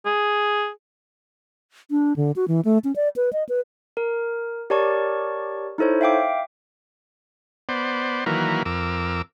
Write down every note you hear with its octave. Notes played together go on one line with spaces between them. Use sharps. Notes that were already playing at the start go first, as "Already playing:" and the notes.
G#4
D4
D3
F#4
E3
A3
C#4
D5
B4
D#5
B4
A#4
G4 A#4 C#5 D5 A5 C#6
D#4 E4 A4 C5 C#5
E5 F5 G5 D6
B3 C5 D5
D#3 E3 F#3 A#3 A#4 B4
F2 A#4 D6 E6